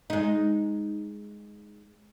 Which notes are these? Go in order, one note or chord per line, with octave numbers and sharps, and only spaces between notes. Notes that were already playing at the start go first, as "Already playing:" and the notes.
G#3 D#4